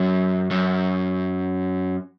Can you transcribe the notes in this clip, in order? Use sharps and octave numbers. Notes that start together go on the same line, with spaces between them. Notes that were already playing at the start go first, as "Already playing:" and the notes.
Already playing: F#2
F#2